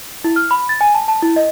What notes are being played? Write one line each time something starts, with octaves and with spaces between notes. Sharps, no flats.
E4
F6
B5
A6
G#5
A5
A5
E4
D#5